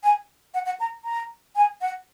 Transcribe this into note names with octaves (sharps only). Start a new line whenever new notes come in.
G#5
F#5
F#5
A#5
A#5
G#5
F#5